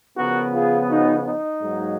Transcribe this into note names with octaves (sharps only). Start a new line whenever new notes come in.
C#3 F3 B3 F#4 A#4
F4 G#4
D#4 F#4
D#4
G#2 F#3 A#3